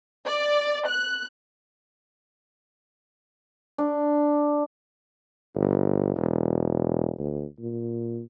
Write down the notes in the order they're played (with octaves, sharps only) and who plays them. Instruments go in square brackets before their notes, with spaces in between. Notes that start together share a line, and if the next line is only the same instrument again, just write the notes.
[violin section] D5
F#6
[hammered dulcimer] D4
[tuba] G1
E1
D2
A#2